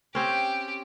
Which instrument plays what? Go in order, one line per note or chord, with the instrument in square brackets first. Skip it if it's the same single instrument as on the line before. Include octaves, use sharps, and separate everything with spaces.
[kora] C4 C#4 [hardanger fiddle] G4